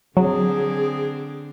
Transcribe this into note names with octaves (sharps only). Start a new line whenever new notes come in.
D3 F#3 C4 D4 G#4